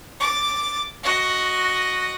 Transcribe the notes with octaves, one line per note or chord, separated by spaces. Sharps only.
D6 A6
F#4 D#5